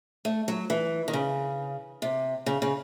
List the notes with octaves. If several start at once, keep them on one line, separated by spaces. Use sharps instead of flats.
A3
F#3
E3
D#3
C#3
C3
C#3
C#3